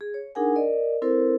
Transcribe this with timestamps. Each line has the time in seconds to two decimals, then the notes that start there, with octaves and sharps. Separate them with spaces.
0.01 G#4
0.14 C#5
0.35 D4 D#4 G#4 A#4 F#5 G#5
0.56 A#4 D5 D#5
1.02 C4 E4 A4 A#4 C5